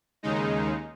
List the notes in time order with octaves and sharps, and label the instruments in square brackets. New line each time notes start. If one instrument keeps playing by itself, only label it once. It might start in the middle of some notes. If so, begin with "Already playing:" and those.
[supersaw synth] D#2 C#3 G#3 D#4